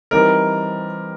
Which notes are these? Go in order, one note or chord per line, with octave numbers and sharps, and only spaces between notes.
E3 G3 C4 D#4 A#4